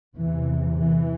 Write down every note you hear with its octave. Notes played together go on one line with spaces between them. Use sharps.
E2 C3 E3
E3